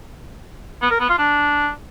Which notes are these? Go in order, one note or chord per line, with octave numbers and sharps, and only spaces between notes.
B3
A#4
B3
F4
D4